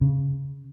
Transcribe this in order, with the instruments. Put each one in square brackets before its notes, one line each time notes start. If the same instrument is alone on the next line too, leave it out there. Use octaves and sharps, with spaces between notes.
[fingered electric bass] C#3